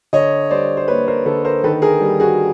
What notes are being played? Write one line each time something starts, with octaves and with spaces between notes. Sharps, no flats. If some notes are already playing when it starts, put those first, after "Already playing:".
D3 C#5 D#5
G3 C5 D5
C5
A#3 B4 C#5
A#4 C5
D3 A4 B4
A#4 C5
D#3 A4 B4
G#4 A#4
G3
F#4 G#4